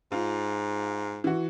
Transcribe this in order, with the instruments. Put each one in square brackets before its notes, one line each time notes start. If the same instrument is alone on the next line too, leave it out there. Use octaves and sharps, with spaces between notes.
[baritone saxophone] G#2 [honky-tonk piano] F4
[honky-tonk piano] E3 F#4